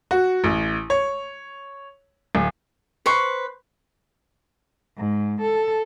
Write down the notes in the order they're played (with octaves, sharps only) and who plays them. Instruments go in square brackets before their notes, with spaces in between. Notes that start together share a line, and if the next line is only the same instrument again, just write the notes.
[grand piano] F#4
A1
C#5
D1
[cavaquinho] B4 C5 C#6
[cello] G#2
A4